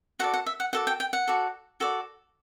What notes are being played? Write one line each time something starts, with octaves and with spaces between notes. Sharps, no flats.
F#4 A4 D5 F#5
F#5
E5
F#5
F#4 A4 D5 F#5
G5
G5
F#5
F#4 A4 D5
F#4 A4 D5